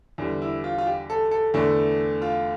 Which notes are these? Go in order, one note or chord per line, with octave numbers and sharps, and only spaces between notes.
E2 D3 G3
E4
F4
F4
G4
A4
A4
E2 D3 A3 E4
F4